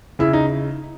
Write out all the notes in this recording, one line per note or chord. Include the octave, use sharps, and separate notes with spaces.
C#3 E4
D#4